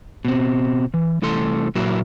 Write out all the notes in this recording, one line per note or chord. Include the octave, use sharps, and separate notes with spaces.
B2 C4
E3
C2 E3 A3 A4 C6
A#2 F#3 A#3 E4 F#4